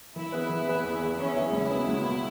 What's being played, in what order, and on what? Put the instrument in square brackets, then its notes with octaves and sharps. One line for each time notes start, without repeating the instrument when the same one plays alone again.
[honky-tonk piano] E3 [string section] E4
[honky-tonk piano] B3 G#4 B4
E3
B3 G#4 B4
E2
E3 B3 G#4 E5
[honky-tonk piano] E2 [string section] C#4
[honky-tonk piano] E3 B3 G#4 E5
[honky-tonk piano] C#2 [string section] E4
[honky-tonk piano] B2 B3
C#2
B2 B3